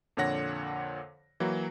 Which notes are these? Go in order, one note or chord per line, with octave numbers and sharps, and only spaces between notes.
F2 A#2 D3 C#5 F#5 A#6
E3 F#3 A#3 E4 F#4